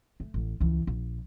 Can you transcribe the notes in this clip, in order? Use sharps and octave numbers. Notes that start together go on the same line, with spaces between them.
A3
A1
C#2 E3
A#1